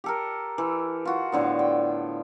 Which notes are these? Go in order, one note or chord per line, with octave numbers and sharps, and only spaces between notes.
G4 A4 A#4
E3
F4 F#4
A2 D3 B3
G5